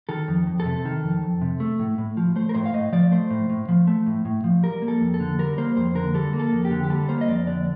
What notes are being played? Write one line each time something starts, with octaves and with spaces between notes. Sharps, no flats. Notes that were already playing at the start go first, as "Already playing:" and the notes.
D#3 A4
F2
F2
A4
C3
D#3
F2
F2
C3
A3
A2
A2
F3
A3 C5
A#4
A2 C5
F5
A2 D#5
F3 D5
A3 C5
A2
A2
F3
A3
A2
A2
F3
G3 A#4
A#3
A4
F2
A4
D3
G3 A#4
A#3 C5
F2 C5
D3 A#4
G3 A4
A#3
A4
F2
G4
D3
G4
G3 A4
A#3 C5
D#5
F2 D5
D3 D5